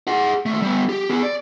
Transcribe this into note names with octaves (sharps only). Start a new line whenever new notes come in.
G#4 F#5
D#2 A3
G3 B3
G4
B3 G#4
D5